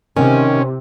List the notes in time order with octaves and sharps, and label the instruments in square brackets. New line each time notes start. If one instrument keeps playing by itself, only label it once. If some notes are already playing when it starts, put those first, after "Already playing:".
[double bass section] C3 [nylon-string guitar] D#3 [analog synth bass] C#4